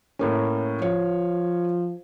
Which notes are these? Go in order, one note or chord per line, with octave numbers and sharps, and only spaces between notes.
A2 A#3 C#4
F3 C#5 F5